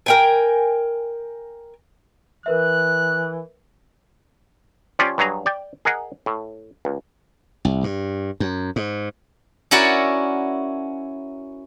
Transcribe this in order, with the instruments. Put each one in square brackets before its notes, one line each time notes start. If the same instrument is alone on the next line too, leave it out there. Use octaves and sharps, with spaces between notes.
[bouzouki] A#4 G5 G#5
[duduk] E3 [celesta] A#4 B4 E5 [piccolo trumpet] F#6
[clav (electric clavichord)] F3 C#4 F4 G4 D5
G2 F#3 G#4 A#5
D5 G5
G#4 A#4 D#5 F#5
A2
C#2
[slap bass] C2
G2
F#2
G#2
[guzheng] C#4 E4 F#4 A#4 C#5 D5